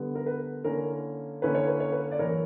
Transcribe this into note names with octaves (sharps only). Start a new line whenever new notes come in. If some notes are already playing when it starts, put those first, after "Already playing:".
Already playing: D3 G3 B3
A#4
B4
D3 A#3 C#4 E4 A#4
D3 A#3 C#4 E4 B4
C#5
B4
C#5
B4
D5
F#2 E3 A#3 A#4 C#5